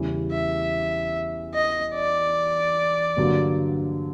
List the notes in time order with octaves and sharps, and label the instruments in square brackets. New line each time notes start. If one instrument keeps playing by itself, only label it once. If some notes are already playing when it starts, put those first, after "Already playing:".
Already playing: [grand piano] E2 C#3 E3 G3
[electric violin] E5
D#5
D5
[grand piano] G2 D3 F#3 A#3